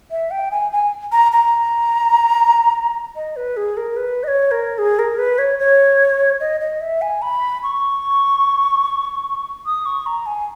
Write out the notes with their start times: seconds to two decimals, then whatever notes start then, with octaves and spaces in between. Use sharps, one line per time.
0.11 E5
0.31 G5
0.51 G#5
0.72 G#5
1.12 A#5
1.32 A#5
3.16 D#5
3.36 B4
3.57 G#4
3.77 A#4
3.97 B4
4.24 D#5
4.28 C#5
4.51 A#4
4.78 G#4
4.99 A#4
5.18 B4
5.38 C#5
5.59 C#5
6.40 D#5
6.60 D#5
6.81 E5
7.02 G#5
7.22 B5
7.63 C#6
9.66 D#6
9.86 C#6
10.06 A#5
10.26 G#5